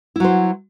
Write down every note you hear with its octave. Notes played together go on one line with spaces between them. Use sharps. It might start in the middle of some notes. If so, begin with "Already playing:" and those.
F#3 E4 C5